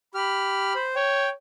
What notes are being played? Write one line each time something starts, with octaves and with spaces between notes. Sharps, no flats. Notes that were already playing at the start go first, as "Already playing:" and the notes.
G4 B5 F6
C5
C#5 G5